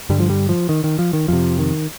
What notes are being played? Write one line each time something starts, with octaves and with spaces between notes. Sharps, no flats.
G2 D3 G3
F3
G3
F3
D#3
D#3
F3
D#3
F2 C3 F3
D#3